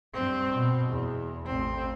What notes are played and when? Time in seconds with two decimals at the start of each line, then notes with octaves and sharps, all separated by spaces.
0.14 G2 C4
0.54 B2
0.89 E2
1.46 A1 C4